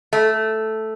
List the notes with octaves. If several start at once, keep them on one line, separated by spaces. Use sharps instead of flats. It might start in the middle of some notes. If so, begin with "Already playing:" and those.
A3